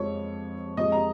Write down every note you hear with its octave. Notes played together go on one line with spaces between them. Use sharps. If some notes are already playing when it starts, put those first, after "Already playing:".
Already playing: F2 F3 G#3 C#5
F2 F3 G#3 D#5
A#5